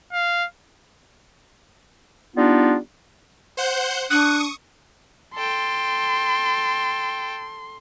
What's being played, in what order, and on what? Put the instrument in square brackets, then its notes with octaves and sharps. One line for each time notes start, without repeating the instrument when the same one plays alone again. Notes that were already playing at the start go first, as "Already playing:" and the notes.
[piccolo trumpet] F5
[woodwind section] G3 B3 D4 D#4 F4
[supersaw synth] C5 F#5 G6
[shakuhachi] D4 [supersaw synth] C#6 D#6 [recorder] F#6
[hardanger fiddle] A4 G5 [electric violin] C6